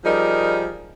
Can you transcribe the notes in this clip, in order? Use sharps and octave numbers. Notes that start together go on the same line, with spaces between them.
F3 G3 D#4 G#4 A#4